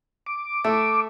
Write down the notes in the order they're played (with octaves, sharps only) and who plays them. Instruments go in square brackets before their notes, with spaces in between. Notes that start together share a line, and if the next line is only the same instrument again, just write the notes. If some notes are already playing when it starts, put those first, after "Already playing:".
[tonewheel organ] D6
[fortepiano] A3 [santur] E5